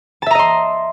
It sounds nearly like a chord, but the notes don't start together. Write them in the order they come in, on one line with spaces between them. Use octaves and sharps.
A5 E5 A#5 D#5 C6